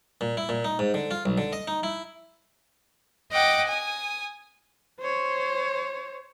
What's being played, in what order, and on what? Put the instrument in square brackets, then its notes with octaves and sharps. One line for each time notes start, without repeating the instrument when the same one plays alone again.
[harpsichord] A#2
E4
A#2
D#4
G#2
D3
F4
B1
D3
D#5
D#4
E4
[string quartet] D#5 F#5 G5 D6
G#5 D#6
[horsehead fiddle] C5 C#5